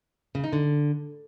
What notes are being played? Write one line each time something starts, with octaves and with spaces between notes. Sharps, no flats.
C#3
D#4
D3